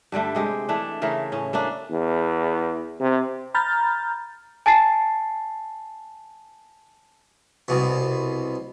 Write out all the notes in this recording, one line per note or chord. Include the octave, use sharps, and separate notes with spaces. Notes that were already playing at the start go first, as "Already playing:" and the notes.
G2 D3 G3 A3
C3 G#3 G4
E3 A3 D4
C#3 E3 A3 A#4
A2 C#4
A3 A#3 C#4 D4
E2
C3
A#5 B5 F6 G6 A6
G#5 A5 A6 C7
C2 B2